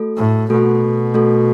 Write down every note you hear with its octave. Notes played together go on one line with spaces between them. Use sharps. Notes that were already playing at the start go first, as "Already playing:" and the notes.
Already playing: A3 F#4 A4
A2
B2 A3 F#4 A4
A3 F#4 A4